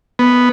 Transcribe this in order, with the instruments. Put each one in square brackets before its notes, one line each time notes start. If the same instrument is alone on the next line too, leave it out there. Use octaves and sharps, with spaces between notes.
[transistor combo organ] B3